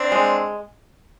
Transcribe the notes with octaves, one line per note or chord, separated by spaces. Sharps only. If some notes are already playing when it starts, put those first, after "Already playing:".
Already playing: C4 D4
G#3